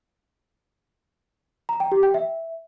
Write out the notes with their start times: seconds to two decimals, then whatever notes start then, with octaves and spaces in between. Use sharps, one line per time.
1.69 A#5
1.80 G5
1.92 G4
2.03 G5
2.14 E5